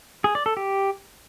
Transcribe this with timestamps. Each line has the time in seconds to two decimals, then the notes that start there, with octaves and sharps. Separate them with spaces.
0.24 G#4
0.35 D5
0.46 A4
0.57 G4